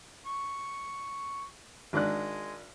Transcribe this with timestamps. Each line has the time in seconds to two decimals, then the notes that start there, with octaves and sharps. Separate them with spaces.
0.26 C#6
1.93 G#1 G#3 D4 F#6